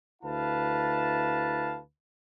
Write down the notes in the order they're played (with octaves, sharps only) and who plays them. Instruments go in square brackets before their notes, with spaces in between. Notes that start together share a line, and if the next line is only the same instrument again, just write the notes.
[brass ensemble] D2 E4 B4 F5 A5